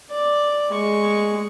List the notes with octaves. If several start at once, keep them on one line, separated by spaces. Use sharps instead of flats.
D5
G#3 C#6